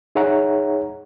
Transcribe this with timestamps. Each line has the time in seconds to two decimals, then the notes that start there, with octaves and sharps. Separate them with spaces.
0.15 D#4 G#4 C#5 E5 F#5 A#5